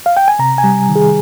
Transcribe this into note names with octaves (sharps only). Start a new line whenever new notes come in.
F5
G5
G#5
C3 A#5
G#5
G3
D#3
G#4